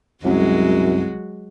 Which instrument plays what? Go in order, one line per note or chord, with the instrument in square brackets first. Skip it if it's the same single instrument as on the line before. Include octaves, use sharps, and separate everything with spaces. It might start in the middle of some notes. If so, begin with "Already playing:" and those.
[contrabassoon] C2 [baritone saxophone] F#2 [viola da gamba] F#3 G#3 F#4